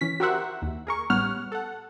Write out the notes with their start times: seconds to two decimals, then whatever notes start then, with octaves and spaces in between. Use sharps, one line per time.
0.01 E3 C#4 B6
0.20 F#4 G4 A#4 C5 E5 F#5
0.62 D#2
0.87 G#4 A#4 C#6
1.10 A1 G3 B3 C#5 F#5 F6
1.52 A4 F#5